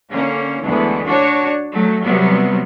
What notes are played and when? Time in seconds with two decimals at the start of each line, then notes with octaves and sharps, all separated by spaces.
0.11 D3 A#3 C#4
0.64 D2 E3 G#3 B3
1.04 D4 F#4 C#5
1.73 F#3 A3
2.05 C3 F#3 G3 B3